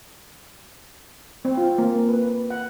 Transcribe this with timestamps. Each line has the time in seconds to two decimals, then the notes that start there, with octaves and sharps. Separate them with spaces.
1.45 C4
1.57 F4
1.78 A#3
2.09 B4
2.50 F#5